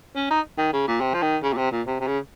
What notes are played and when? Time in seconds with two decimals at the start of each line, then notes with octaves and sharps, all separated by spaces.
0.15 C#4
0.30 D#4
0.58 D#3
0.73 C#3
0.87 A#2
1.01 C3
1.14 F3
1.22 D#3
1.43 C#3
1.53 A#2
1.57 C3
1.71 A#2
1.87 C3
2.00 C3
2.07 C#3